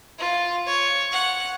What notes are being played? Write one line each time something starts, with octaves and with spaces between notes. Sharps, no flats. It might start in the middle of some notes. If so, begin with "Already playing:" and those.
F4
C#5
F#5